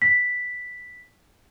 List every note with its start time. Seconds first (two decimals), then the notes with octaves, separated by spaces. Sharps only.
0.02 B6